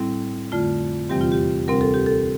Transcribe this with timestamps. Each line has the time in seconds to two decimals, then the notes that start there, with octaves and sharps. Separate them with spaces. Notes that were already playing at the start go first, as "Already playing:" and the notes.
Already playing: A2 G3 C4 E4
0.52 F2 D3 A3 F4
1.09 E2 C3 E3 G3 C4 G4
1.21 F4
1.32 G4
1.68 D2 C3 G3 C4 A#4
1.81 A4
1.94 G4
2.06 A4